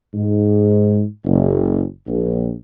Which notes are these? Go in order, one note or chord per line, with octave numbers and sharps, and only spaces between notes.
G#2
F#1
A#1